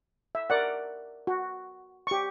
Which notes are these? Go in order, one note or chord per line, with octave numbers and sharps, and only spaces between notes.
E5
A#4 D5 F#5
F#4
G4 C#6